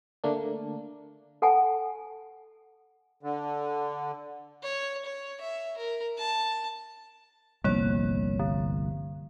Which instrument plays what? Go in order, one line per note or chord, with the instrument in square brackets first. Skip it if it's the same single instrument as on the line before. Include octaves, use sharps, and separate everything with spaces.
[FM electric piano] D3 A3 A#3 D4
[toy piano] A4 F#5 G#5 A5
[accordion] D3
[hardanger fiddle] C#5
C#5
E5
A#4
A5
[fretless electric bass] G1 C2 [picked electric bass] F3 G3 [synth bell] A#3 C#5
[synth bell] D3